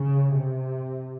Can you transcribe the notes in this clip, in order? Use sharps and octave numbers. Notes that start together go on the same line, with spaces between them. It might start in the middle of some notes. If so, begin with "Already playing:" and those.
Already playing: C#3
C3